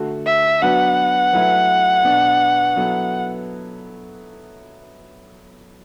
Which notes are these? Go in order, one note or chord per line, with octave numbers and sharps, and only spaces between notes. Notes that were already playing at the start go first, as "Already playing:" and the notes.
Already playing: D3 A3 F#4 A4
E5
F#3 B3 D4 F#4 B4 F#5
F#3 A3 E4 B4
B2 B3 D4
F#3 B3 E4 A4